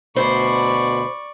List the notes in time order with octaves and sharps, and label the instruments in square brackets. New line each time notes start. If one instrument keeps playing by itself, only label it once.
[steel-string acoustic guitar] D2 C5 [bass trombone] B2 [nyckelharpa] D5 C#6 [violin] B5